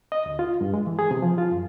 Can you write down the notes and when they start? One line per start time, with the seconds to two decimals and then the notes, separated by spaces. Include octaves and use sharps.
0.12 D#5
0.26 D2
0.39 F4
0.61 G2
0.74 G#3
0.86 E3
0.99 G#4
1.11 C3
1.22 F3
1.38 F4
1.51 F#2